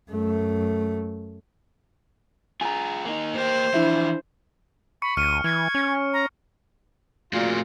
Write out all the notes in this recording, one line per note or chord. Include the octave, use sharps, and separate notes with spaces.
F#2 A3
F4 G#4 G#5 A#5
A#3 D#4
A#3 G4 C5
E3 F3 D4 E4 E5
B5 C#6 C#7
D2 F6 C#7 D#7
E3 G#6
C#4
A#5
A#2 A3 F4 F#4 G#4